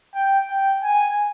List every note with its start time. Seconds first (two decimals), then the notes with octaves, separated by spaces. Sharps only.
0.15 G5
0.49 G5
0.83 G#5